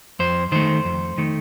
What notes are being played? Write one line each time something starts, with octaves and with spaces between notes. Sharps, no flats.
F2 C5
D#3 A3 C5
F2
D#3 A3